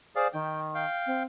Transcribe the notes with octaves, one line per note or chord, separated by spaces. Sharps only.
G#4 C5 D5 F5
D#3 G5
F5 G5
C4